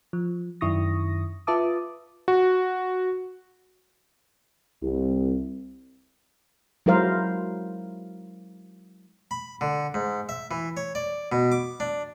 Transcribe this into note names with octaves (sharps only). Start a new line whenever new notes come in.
F3
F#2 D#3 E4 C#6 D#6 A#6
F4 B4 E5 A5 D6 D#6
F#4
C2
F#3 G#3 E4 A#4 C5 F5
B5
D3
G#2
E5
E3
C#5
D5
B2
D6
D4